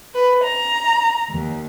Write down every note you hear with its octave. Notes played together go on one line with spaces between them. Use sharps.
B4
A#5
D#2